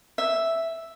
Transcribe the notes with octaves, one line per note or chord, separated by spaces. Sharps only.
E5